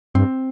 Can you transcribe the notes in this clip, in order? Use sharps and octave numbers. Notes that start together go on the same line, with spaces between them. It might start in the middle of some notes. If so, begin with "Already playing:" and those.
G2 C4